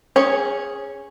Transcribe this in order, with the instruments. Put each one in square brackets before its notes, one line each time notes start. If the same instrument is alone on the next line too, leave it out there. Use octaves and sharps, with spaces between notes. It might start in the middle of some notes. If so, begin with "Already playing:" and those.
[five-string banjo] C#4 G#4 C#5